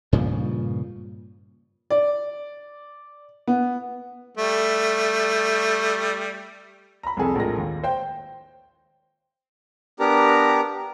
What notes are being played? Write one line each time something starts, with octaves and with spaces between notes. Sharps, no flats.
G2 A#2 C#3 F3
D5
B3
G3 A3
A#5 B5
C2 F2 G#4 A4
A#1 A2 G#3 A#4 A#6
D#2
C5 G5
B3 D4 G4 A#4 A#5